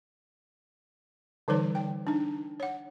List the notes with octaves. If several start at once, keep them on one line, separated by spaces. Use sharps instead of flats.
D3 E3 G3 D#4 B4 C#5
G5
D4 D#4
C#5 F#5